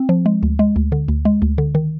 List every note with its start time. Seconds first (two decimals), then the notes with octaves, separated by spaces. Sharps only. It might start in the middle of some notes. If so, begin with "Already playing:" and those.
Already playing: C4
0.09 F3
0.26 G#3
0.43 D2
0.59 G#3
0.76 D2
0.92 D3
1.08 D2
1.25 G#3
1.42 D2
1.58 D3
1.75 D#3